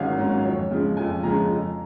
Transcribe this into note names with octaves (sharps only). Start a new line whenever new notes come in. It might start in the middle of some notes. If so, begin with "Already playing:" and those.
Already playing: G#1 G#2 F#3 C#4 F5 F#5 G#5
G#2 F#3 C#4
F2 C#5
C#3 F3 G#3
F2 G#5
C#3 F3 G#3 A#5
F2